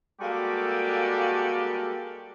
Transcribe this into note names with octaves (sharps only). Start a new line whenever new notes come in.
G3 G#3 A#3 F#4 G4 A4